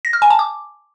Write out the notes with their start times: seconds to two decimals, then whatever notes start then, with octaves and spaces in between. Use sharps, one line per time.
0.05 A#6
0.13 F6
0.22 G#5
0.30 A5
0.39 D6